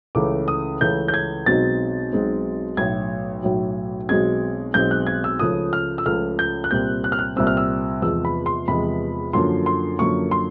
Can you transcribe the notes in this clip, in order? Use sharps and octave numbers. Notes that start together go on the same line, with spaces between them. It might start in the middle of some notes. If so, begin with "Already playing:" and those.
C#2 C#3 E3 A3 D6
D#6
C#2 C#3 E3 A3 G6
G6
G#6
B1 B2 G#3 C4 D#4 A6
B1 B2 G#3 C4 D#4
B1 A2 F#3 G#6
B1 A2 F#3
B1 B2 G#3 C4 G#6
B1 B2 G#3 C4 G6
F#6
G#6
E6
C#2 C#3 F3 A3 D#6
F6
E6
C#2 C#3 F3 A3 F6
G6
F#6
C2 A#2 G3 C4 G6
F#6
F6
F#6
C2 A#2 G3 C4 E6
F6
E6
E2 C3 F3 G#3 E6
B5
C6
E2 C3 F3 G#3 B5
F#2 D3 F3 A#3 C6
C6
F#2 D3 F3 A#3 C#6
C6